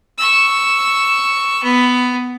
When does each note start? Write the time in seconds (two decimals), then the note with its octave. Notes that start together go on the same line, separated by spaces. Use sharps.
0.18 C#6 E6
1.63 B3